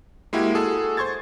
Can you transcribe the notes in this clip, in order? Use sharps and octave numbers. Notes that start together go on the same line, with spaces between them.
G#3 A#3 E4 F#4 G4
F#4 G#4 A4
C5 C6 C#6 G#6 A6